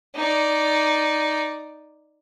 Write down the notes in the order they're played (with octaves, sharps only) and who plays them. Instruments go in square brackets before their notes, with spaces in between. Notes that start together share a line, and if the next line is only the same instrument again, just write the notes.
[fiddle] D#4 D5